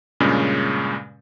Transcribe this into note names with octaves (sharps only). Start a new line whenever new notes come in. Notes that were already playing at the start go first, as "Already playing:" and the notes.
G2 A#2 C#3 G#3 C#4